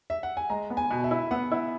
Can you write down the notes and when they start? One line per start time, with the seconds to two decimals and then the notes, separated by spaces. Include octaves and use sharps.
0.10 E5
0.23 F#5
0.37 G#5
0.50 G#3 A#5
0.70 B3
0.77 G#5
0.91 B2
1.04 E5
1.11 E4
1.31 B3 F#5
1.52 E4